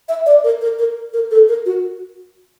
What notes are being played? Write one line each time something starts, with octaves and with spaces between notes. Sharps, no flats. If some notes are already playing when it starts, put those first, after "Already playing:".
E5
D5
A#4
A#4
A#4
A#4
A4
A#4
F#4